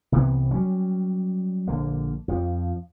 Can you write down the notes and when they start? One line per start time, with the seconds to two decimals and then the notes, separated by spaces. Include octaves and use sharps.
0.12 C2 C3 E3 B3
0.51 F#3 G3 C#4
1.68 A#1 D3 A#3
2.28 F2 F3